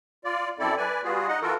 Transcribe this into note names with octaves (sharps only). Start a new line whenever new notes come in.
F4 D5
F#2 C4 E4 A4 D5
B4 D5 G#5
G3 B3 F4 F#4 G#4
D#4 D#5 F#5
E3 F4 F#4 A4 A#4